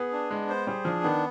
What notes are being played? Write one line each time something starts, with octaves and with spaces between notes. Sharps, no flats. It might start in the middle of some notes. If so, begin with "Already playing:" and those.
Already playing: B3 G#4
D4
G#3 B3
C5
G3 G#4
F3 D4
D#3 B3